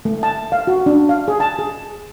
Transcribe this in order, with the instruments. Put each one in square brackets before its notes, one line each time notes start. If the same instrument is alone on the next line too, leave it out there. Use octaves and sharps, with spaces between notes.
[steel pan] A3
A5
F5
F#4
D4
F5
G#4
A5
G#4